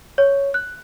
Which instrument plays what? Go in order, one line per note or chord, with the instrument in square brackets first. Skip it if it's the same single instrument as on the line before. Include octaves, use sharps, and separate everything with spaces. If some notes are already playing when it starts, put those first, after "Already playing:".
[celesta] C#5
F#6